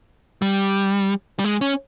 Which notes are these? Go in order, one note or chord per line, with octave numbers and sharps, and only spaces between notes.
G3
G3
G#3
C#4